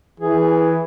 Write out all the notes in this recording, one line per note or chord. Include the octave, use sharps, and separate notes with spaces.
E3 G#4